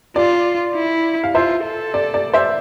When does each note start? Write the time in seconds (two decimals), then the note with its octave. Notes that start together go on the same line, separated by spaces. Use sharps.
0.16 F4 D5
0.76 E4
1.24 F5
1.35 F4 C5 E5
1.64 A4
1.94 D5
2.14 D5
2.34 C5 E5